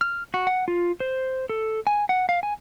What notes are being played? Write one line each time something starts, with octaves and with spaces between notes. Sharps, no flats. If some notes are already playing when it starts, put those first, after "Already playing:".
F6
F#4
F#5
F4
C5
A4
G#5
F#5
F5
G#5